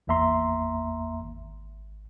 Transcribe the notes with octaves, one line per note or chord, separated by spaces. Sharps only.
G#1 E2 A#3 E5 A#5 C6
G#1